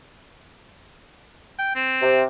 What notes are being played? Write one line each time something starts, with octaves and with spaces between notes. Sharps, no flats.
G5
C4
C3